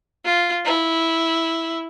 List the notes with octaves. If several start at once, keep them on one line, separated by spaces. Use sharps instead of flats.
F4
E4